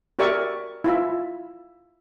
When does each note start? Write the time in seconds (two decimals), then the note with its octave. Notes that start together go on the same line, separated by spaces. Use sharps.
0.19 F#4 G4 A#4 D5 E5 C#6
0.84 E4 F4 E5